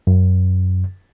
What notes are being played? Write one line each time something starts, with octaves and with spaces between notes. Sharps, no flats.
F#2